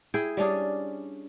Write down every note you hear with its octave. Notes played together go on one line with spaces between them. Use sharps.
E4 G#4 G5
G3 C#4 D4 G#4